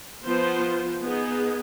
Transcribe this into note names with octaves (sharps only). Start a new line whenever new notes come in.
F3 B3 F4 C5
B3 D#4 G#4